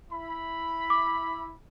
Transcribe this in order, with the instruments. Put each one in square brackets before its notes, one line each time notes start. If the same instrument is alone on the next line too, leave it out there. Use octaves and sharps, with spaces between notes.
[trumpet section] E4 B5
[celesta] D6